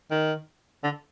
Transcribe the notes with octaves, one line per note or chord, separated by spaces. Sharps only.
D#3
D3